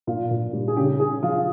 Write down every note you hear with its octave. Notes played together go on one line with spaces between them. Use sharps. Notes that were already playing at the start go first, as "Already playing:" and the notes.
A#2 F4
A#2
G3
G#4
C#3 G4
C#3 G#4
F3 F4